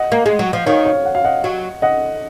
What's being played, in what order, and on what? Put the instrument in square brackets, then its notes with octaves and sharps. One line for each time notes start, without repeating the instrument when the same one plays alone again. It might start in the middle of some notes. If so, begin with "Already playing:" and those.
Already playing: [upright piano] D#5 F#5
[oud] A#3
G#3
F#3
F3
[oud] D#3 [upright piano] C#5 F5
[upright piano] C#5 F5
F#5
F5
D#5 F#5
[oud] F#3
[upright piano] D#5 F#5